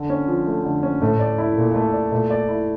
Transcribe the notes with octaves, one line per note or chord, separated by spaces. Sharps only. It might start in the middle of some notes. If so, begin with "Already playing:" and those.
Already playing: D3
C#4
F3
A3
D3
C#4
A2 A3
D5
E4
A#2 A4
A3
D5
A#2 A3
D5
E4